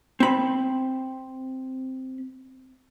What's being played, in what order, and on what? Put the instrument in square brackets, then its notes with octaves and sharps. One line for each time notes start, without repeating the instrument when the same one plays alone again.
[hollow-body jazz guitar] C4 B5